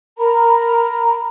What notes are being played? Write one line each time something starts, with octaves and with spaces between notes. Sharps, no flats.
A#4 A#5 B5